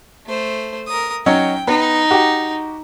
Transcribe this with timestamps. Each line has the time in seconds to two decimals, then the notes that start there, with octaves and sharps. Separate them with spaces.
0.26 A3 C5
0.88 A#4 D#6
1.26 F#3 C#4 D#4 G5
1.67 B3 D#4
2.11 F#4 G4